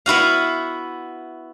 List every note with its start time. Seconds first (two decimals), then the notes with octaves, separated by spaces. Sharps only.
0.06 B3 E4 F#4 F5